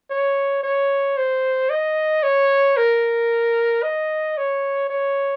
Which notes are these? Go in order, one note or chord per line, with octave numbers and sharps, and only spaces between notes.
C#5
C#5
C5
D#5
C#5
A#4
D#5
C#5
C#5